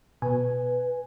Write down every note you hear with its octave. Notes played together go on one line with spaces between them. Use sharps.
B2 B4 G#5